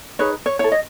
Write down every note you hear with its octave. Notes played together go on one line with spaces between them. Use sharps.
D#4 G#4 B4 C#5
C#5
E4 A4 C#5
D#5